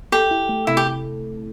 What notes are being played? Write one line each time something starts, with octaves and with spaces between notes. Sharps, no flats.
G4 A4
E4
A3
C3 E4
G4